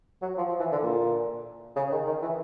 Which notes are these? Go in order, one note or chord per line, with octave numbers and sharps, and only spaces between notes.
F#3
F3
F3
E3
D3
A#2
C#3
D#3
D#3
E3